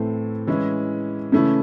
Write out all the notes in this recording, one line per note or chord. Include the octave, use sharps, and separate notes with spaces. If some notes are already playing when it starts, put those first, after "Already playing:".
Already playing: A2 E3 A3 C4
E3 G#3 C#4 E4
C#3 E3 A3 C#4 E4